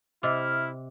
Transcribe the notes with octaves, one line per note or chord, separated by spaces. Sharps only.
C3 E4 D#5 D6 D#6 F6